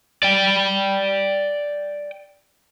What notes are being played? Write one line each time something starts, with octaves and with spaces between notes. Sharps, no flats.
D5 G5